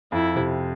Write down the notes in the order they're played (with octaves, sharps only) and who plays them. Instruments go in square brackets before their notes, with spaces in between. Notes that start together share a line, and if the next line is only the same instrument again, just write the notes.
[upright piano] F2 [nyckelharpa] E4
[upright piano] C3